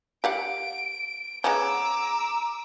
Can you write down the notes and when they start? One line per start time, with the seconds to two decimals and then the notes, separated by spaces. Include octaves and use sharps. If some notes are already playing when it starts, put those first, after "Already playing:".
0.24 G4 F5 F#5 D7
1.44 G#3 B3 C#4 A#5 D6 E6